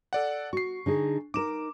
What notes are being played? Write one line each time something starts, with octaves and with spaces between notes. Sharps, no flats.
A4 D5 F#5
F#4 C#6 C7
D3 D#4 G#4
D#4 A#4 D6 E7